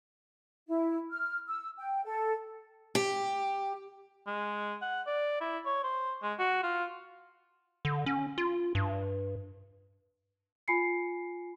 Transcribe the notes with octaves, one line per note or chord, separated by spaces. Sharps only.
E4
F6
E6
G5
A4
G4
G#3
F#5
D5
E4
C#5
C5
G#3
F#4
F4
D3
C#4
F4
G2
F4 G#5 B5 C7 C#7